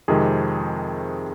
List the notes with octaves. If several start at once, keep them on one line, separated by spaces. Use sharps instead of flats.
F2 C3 D#3 G#3 G#4